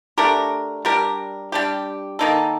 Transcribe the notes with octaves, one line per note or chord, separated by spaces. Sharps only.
A3 D4 G4 A#4
G3 D4 G4 A#4
G3 D4 G4
D#3 A#3 D#4 A4